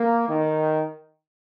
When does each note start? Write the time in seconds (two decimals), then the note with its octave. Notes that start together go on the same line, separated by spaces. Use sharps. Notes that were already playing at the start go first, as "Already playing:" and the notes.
Already playing: A#3
0.29 D#3